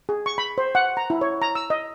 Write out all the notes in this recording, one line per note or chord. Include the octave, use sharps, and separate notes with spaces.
G#4
C#6
B5
C5
F#5
A#5
E4
C#5
A#5
E6
D#5